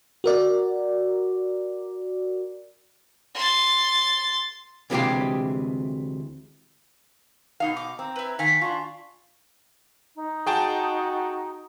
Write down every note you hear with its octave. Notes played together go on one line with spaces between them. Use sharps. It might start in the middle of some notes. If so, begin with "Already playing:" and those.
F#4 A#4 D5
C6 A6
D2 C3 E3 G#3 G4 F5
B2 D#4 F5
D6
C4 A#5
E4 B4
D#3 F5 G#5 A#5 B6
D4 F4 C#6
D#4
F#4 G#4 G5 A5